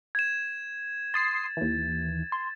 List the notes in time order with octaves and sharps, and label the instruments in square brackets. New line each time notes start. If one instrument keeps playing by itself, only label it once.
[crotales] G#6 E7
[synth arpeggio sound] C6 D#6 C7 [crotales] A6
[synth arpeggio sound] D#2 E3
C6